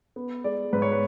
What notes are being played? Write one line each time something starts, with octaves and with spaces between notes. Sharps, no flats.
B3
G#3 D5
G#2 B4
C#5
B4